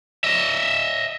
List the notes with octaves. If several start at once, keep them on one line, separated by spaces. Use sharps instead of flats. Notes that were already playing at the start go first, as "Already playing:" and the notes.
D#5 E5